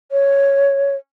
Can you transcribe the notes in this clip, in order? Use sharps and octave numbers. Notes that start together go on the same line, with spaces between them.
C#5